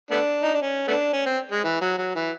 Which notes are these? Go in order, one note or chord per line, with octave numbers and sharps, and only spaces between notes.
A3 B3 D4
D#4
D4
C#4
A3 B3 D4
C#4
C4
G#3
E3
F#3
F#3
E3